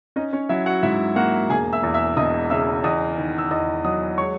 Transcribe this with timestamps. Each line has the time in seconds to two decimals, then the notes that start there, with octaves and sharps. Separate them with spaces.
0.16 C#4 D#4 D#5
0.33 C#4 C#5
0.49 F#3 E4 E5
0.66 F#4 F#5
0.83 G#2 E4 E5
1.16 A#3 F#4 F#5
1.50 E1 G#4 G#5
1.73 E5 E6
1.83 E2
1.94 E5 E6
2.17 E1 D#5 D#6
2.50 C#3 E5 E6
2.84 E2 D#5 D#6
3.17 D#3
3.38 E6
3.51 E2 D#5 D#6
3.84 F#3 D#5 D#6
4.18 G#3 C#5 C#6